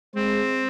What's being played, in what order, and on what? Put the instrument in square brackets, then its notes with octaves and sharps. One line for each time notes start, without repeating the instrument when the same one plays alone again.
[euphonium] G#3 [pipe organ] C4